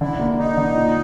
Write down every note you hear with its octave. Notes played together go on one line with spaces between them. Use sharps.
D3 E4
A#3
D4 D#4
D3
A#2